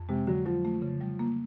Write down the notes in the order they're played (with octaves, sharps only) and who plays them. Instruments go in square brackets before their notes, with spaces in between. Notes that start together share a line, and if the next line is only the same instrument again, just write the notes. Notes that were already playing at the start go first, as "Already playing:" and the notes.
Already playing: [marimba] F2
[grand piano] C3 [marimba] G#3
[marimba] D3 [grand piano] F#3
[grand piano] F3 [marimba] F#3
[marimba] A3
C#3
G3
A#3